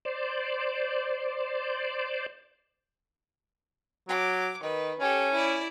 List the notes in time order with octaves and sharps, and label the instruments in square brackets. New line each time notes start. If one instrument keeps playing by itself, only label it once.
[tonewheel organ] C5 D5
[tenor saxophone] F#3 [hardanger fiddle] D6
[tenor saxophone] D#3 [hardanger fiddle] B4
[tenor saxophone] C#4 [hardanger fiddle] G4 A4
[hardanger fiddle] E4 D5